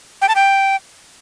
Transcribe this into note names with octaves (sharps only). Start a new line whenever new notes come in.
G5
A5
G5